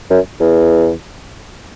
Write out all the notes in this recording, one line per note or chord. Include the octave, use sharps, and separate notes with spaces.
F#2
E2